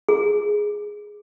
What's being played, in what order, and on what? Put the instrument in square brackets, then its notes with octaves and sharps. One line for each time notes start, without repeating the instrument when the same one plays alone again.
[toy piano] G#4